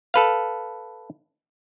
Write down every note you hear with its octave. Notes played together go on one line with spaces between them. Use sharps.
A4 B4 F5